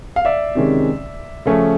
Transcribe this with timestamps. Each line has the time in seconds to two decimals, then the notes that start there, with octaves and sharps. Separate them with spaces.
0.16 F5
0.25 D5 E5
0.55 C3 D#3 G#3 C#4
1.46 C#3 F3 A3 C#4